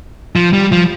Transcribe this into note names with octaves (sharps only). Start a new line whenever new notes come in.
F3
G3
F3